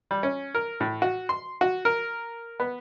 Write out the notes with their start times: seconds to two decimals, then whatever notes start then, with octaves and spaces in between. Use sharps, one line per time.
0.11 G3
0.23 C#4
0.55 A#4
0.80 A2
1.02 F#4
1.29 C6
1.61 F#4
1.85 A#4
2.60 B3